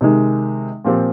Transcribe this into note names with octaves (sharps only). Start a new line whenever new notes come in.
C3 D#3 G#3 D#4
A#2 F3 C4 G4